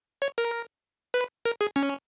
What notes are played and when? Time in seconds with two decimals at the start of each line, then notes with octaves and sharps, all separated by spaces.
0.22 C#5
0.38 A#4
1.14 B4
1.45 A#4
1.61 G#4
1.76 C#4